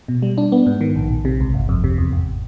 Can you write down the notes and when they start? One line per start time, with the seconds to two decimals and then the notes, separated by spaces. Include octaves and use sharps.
0.08 B2
0.22 G3
0.38 D4
0.52 B3
0.66 G#2
0.81 D#3
0.96 A#1
1.11 A#1
1.25 C3
1.40 C#2
1.54 G1
1.69 F2
1.84 C3
1.98 E2
2.12 G#1